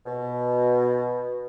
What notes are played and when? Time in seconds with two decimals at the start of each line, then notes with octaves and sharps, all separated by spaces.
0.06 B2